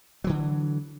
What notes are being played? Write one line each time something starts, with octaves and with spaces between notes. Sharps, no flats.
D3 E3 F#3